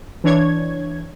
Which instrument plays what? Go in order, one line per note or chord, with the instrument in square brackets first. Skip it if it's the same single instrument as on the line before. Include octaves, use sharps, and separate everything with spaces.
[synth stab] E3 D4 C#5 G#6